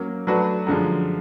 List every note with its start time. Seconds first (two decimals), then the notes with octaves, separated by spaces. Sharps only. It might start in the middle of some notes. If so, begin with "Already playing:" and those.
Already playing: F#3 A#3 C#4
0.27 F#3 A3 D4 F#4 B4
0.67 F#2 D3 F3 G#3